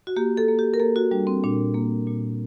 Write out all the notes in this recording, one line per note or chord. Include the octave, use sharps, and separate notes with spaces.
F#4
A#3 G4
A4
A#3
G4
A#4
A#3 A4
F#4
G3 D4
C4
A#2 D4
A#3
A#2